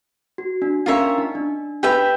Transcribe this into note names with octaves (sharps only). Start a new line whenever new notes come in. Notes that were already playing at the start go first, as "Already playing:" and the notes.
F#4
D4
C#4 F4 A#4 C#5 E5
D4
D#4
D4
G4 B4 E5 G5